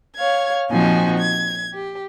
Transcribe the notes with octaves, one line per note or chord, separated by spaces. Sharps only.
C#5 F5 G#6
A#2 F3 C4 D#4 F#4 G#5
G#6
G4